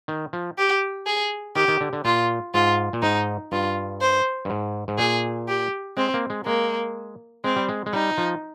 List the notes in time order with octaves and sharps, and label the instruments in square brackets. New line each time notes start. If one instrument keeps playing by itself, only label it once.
[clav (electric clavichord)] D#3
F3
[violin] G4
G#4
[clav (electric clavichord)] D#3 [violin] G4
[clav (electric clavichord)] D#3
D3
D3
[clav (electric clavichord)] A#2 [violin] F4
[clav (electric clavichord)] G#2 [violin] F4
[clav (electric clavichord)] A#2
[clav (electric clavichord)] G#2 [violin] D#4
[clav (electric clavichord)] G2 [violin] F4
[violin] C5
[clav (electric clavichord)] G2
G#2
G#2
[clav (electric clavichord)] A#2 [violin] G#4
[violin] G4
[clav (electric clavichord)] G#3 [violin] C4
[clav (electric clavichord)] A#3
G#3
[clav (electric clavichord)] G#3 [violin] A#3
[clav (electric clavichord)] G#3 [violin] C4
[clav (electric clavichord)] G3
G#3
G#3
[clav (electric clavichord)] G3 [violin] D#4
[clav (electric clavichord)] F3